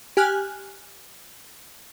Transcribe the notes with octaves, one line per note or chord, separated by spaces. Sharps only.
G4 G#5 F6 F#6